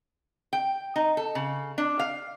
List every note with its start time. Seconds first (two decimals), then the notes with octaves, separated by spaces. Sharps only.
0.53 G5
0.96 D#4
1.17 A4
1.35 C#3
1.78 D4
1.99 F5